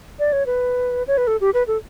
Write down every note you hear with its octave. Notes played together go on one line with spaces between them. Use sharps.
D5
C#5
B4
C#5
B4
A4
G4
B4
A4